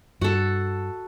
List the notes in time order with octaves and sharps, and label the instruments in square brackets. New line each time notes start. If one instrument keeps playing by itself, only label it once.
[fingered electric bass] G2 [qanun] F#4 A4